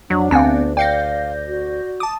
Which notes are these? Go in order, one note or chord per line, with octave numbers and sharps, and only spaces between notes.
F2 F#3 D4
D2 B3 C4 F5 G#5 A5
D5 F5 G5 G6 A#6 C7 C#7
F#4
A5 D6 D#6